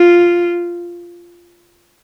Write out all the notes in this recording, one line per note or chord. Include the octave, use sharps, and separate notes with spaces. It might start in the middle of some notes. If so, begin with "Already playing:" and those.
Already playing: F4